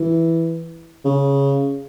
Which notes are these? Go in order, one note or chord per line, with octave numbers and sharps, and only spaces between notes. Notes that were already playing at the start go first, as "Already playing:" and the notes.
Already playing: E3
C#3